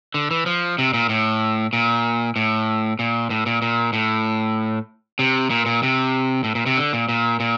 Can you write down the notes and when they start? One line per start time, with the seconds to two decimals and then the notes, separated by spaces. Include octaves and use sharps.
0.14 D3
0.31 E3
0.46 F3
0.78 C3
0.94 A#2
1.09 A2
1.73 A#2
2.36 A2
2.99 A#2
3.30 A2
3.46 A#2
3.62 A#2
3.93 A2
5.19 C3
5.50 A#2
5.66 A#2
5.83 C3
6.44 A2
6.55 A#2
6.66 C3
6.77 D3
6.93 A#2
7.09 A#2
7.40 A#2